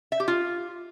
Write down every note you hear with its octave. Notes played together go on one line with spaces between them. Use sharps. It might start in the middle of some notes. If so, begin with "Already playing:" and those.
E5
G4
F4